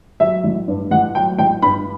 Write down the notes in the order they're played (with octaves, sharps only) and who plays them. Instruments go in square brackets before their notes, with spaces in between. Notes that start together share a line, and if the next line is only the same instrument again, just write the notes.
[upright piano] F#3 E5
A1
G2
A1 F#5
F#3 G5
A1 G5
G2 B5